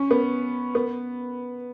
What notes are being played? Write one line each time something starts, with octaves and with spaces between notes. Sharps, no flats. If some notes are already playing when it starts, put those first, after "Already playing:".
Already playing: C#4
B3
B3